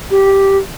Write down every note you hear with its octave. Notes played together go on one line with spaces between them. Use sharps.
G4